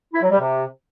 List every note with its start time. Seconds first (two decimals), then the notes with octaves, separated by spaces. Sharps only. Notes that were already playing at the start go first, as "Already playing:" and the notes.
0.13 E4
0.22 F#3
0.30 G3
0.39 C3